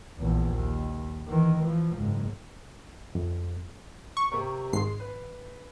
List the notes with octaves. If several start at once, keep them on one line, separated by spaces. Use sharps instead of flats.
A#1 E2
D#2
D#3 E3
E3 F3
F#1 G#2
F2
C#6
C3 G4 A#4
G#1 G#3 C6 C7
B4